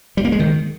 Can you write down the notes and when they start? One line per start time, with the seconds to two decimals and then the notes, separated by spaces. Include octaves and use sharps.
0.17 G3
0.25 A#3
0.32 G#3
0.40 D#3